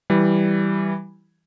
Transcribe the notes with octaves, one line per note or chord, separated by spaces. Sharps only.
E3 G3